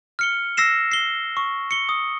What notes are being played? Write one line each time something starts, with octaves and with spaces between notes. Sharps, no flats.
F6 C#7 G7
E6 A#6 C7 E7
C7 G7
C#6
C#7 G7
D#6